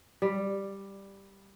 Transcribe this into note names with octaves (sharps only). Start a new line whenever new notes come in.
G3